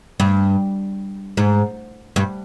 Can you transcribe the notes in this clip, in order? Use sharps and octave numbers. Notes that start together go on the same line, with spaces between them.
G2
G#2
G2